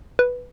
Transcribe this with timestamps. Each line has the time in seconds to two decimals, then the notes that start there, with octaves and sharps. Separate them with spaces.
0.19 B4